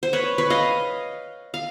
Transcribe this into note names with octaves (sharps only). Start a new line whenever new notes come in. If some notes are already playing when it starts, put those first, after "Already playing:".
C5
B4 C#5
B4 C#5
D#5 F5
F5